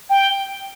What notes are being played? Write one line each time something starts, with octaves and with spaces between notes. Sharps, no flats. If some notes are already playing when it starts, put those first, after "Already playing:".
G5